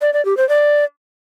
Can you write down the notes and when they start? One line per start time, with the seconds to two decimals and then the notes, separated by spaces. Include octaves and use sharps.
0.01 D5
0.13 D5
0.25 G4
0.37 C5
0.49 D5